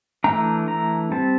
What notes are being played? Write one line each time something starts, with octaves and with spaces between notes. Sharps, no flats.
E3 A3 D4 A#5
A#5
G3 C4 A5